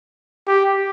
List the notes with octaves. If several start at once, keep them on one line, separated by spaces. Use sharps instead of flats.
G4